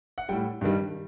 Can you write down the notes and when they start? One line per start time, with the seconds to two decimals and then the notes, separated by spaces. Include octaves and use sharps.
0.18 F#5
0.29 A2 G3 G5
0.61 G2 D#3 G3